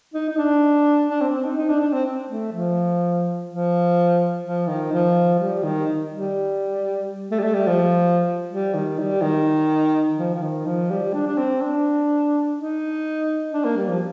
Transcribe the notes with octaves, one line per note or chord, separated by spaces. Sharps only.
D#4
D#4
D4
D4
C4
C4
D#4
D#4
D4
D4
C4
A3
F3
F3
F3
D#3
F3
G3
D#3
G3
A3
G3
A3
G3
F3
G3
D#3
G3
D#3
F3
F3
D#3
F3
G3
D4
D4
C4
D4
D#4
D4
A#3
G3
F3